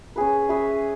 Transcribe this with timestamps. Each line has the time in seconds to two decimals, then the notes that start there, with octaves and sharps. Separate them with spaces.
0.16 C#4 G#4 B4
0.49 C#4 G#4 B4 E5